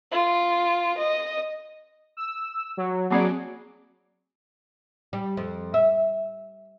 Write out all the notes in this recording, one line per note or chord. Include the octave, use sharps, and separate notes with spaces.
F4
D#5
E6
F#3
F#3 A#3 C4 G#4 D5 D6
G3
F2
E5